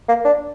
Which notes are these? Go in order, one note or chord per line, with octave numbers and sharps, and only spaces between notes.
A#3
D4